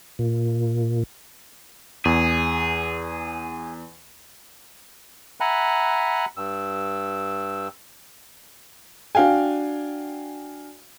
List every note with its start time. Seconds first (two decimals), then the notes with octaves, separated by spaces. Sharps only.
0.19 A#2
2.05 E2 G#4
5.40 E5 F#5 G#5 A#5 B5 F#6
6.37 G2 E6
9.15 D4 F#4 F5 G5 G#5